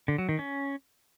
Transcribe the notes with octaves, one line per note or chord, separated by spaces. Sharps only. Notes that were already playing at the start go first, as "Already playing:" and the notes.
D3
F#3
D#3
C#4